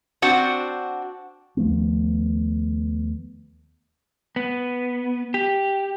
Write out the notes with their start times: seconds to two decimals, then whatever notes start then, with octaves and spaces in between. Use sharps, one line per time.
0.22 C4 D4 F#4
1.57 D#2 F3 A3 B3
4.36 B3
5.34 G4